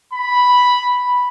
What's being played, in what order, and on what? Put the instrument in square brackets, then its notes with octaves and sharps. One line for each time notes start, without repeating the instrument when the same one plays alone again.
[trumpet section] B5